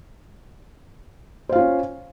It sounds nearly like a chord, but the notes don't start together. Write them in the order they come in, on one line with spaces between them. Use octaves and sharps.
C5 F5 F4 C#4